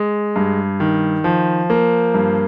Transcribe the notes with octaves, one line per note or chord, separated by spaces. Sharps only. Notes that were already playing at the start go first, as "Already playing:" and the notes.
Already playing: G#3
G2
D#3
F3
A#3
G2